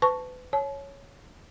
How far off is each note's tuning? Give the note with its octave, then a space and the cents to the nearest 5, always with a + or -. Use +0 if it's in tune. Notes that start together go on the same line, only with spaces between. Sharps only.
B4 +35 A5 +0 C#6 +0
C#5 +0 A5 -45